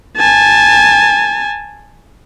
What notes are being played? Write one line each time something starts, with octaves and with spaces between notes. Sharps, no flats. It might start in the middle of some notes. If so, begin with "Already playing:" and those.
G#5 A5